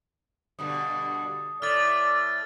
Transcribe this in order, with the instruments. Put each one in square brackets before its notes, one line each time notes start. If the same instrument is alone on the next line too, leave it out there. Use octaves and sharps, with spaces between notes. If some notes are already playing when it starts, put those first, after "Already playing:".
[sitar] G2 B2 D3 [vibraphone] D#6
[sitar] A2 A3 [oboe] D5 [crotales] F6 A6
[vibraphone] E6